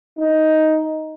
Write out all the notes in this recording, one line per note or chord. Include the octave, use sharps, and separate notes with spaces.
D#4